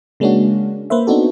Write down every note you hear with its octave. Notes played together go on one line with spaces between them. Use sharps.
C#3 G#3 A#3 C#4 D4 F#4
A#3 B4 C5 E5
B3 C4 D4 D#4 F#4 A4